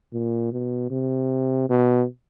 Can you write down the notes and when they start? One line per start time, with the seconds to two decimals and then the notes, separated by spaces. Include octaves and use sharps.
0.13 A#2
0.52 B2
0.91 C3
1.70 B2